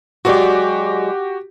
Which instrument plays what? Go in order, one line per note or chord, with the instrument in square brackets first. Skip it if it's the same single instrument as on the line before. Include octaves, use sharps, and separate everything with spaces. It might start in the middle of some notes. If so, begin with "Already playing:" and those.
[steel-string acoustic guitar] F#3 G#3 D5 [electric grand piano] F#4 G4